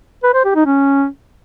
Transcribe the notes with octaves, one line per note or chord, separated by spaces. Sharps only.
B4
C5
G4
D#4
C#4